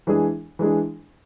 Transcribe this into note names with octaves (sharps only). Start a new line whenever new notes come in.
E3 G#3 D4 G#4
E3 G#3 D4 G#4